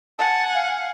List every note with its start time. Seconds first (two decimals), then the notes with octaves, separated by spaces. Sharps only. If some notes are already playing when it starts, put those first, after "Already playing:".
0.19 F#5 G#5 A5
0.54 F5